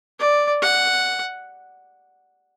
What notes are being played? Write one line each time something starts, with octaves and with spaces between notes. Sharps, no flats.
D5
F#5